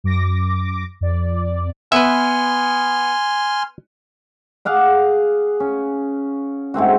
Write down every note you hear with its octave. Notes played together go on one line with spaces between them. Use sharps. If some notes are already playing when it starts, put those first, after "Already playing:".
F#2 D6 A#6
F2 D5
B3 B4 E5 G#5 C6 F6
G#4 F5 F#5 D6
C#4
G#2 A3 C4 F#4